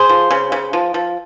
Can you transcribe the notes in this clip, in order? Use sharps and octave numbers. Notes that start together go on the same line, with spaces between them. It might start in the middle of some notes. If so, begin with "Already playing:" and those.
Already playing: G#4 C5
F3
C#3
C#3
F3
F3